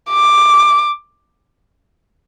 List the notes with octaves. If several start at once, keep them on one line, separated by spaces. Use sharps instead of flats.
D6